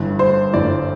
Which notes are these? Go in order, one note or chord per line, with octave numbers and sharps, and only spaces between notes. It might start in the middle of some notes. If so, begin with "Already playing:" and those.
Already playing: G1 G2 E3
C5
G1 G2 E3 D5